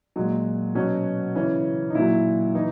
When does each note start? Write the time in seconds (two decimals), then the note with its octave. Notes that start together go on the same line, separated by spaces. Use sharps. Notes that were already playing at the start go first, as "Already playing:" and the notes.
0.16 A#2 F#3 G#3
0.75 B2 F#3 C#4
1.35 C#3 E3 C#4
1.90 D#4
1.95 A#2 F#3 E4
2.55 E3 D#4